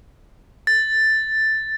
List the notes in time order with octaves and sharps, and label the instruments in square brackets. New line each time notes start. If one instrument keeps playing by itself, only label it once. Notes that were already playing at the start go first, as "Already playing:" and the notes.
[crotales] A6